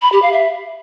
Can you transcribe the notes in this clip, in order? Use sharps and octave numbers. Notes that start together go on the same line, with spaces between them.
B5
G4
F5
E5